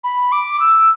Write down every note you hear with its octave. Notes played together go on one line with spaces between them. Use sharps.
B5
D6
E6